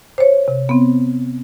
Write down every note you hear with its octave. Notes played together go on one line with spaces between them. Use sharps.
C5 C#5
C3
B3 C4